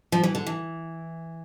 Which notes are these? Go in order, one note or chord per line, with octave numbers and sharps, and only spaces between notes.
F3
E3
D3
E3